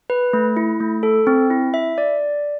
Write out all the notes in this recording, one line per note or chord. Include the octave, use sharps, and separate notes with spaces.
B4
A3
E4
A3
A4
C4
E4
E5
D5